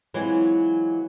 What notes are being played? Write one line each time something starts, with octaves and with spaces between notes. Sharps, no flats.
E3 F#3 G#3 C4 F4